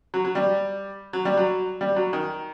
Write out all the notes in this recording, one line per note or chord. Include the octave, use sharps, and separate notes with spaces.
F#3
F#3
G3
F#3
G3
F#3
G3
F#3
D#3